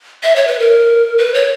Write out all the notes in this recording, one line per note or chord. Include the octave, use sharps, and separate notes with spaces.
E5
C#5
B4
A#4
B4
C#5